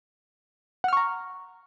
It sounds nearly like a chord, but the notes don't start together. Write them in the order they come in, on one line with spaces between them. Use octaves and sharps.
F#5 F6 C#6 A#5